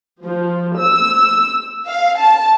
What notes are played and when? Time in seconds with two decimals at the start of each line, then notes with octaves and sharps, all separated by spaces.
0.24 F3
0.79 E6
1.87 F5
2.18 A5